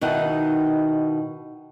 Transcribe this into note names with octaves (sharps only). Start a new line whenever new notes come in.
B2 D#3 D#4 E4 F#5